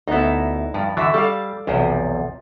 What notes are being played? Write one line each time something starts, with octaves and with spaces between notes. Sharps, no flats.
D2 B3 D#4 E4
G2 F3
D3 E3 D4 F#4 E5
G3 A4 D5 F5
B1 E2 C3 F3